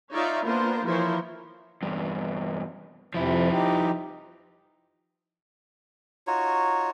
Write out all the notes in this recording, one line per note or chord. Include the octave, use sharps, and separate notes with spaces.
D#4 F4 C#5 D5 E5 F5
A#3 B3 D4 F4 A#4 C5
E3 F3 E4 A#4 C5 C#5
E2 G2
F2 C3 F3 E4
D#4 G4
D#4 F4 F#4 C#5